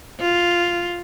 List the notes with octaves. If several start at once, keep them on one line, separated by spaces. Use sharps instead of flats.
F4